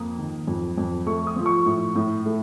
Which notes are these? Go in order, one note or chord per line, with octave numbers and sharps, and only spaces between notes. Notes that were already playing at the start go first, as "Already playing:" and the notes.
Already playing: F2 A#3 D#6
D#3
F2
F2
A3 C#6
D#6
F3
C#6
A2
A2
A3